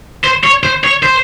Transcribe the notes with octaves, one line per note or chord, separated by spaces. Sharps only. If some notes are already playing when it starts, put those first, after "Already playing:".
C5
C#5
C5
C#5
C5